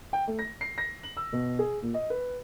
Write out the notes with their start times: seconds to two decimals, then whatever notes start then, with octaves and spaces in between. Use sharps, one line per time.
0.13 G5
0.27 A3
0.39 A#6
0.61 C7
0.78 A#6
1.03 F#7
1.17 E6
1.33 B2
1.59 G#4
1.82 A#2
1.94 D#5
2.10 B4